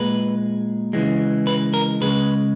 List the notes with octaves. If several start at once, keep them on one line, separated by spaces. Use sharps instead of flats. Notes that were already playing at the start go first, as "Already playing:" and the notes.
Already playing: A#2 G#3 B4
C#3 E3 G#3
B4
A#4
C#3 G#3 B4